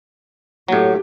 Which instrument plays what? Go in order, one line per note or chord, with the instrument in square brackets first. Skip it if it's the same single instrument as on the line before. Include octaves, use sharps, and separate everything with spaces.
[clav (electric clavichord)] A2 F#3 [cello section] A3 G4